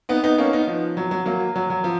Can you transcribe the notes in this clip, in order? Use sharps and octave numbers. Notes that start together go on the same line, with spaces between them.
B3 D#4
B3 D#4
A#3 C#4
B3 D#4
F3
F#3
F#3
F#3 A#3
F#3
F#3
F3